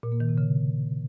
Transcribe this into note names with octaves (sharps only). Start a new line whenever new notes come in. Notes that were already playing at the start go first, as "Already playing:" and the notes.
A#2
A#3
D#3
C3
C#3